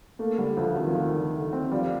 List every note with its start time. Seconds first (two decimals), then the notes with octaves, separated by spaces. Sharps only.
0.19 A3 A#3
0.38 D3 G3
0.57 D2 F3
0.76 D#3 C4
0.87 F3
0.95 D#3 A3
1.14 D3
1.34 D2
1.53 C4
1.71 F3 G3